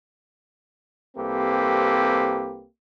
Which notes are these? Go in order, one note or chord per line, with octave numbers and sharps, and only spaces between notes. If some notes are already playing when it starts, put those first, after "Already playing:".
C2 A#3 C4 G4 A4 B4